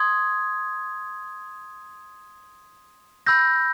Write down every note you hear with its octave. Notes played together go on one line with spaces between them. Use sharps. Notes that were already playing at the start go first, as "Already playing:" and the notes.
Already playing: C6 D#6 G#6
B5 E6 G6 A#6